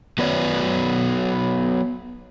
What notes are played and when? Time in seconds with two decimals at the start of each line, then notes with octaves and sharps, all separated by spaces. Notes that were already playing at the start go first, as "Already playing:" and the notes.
0.18 F#3 B3 B4 C#5 D5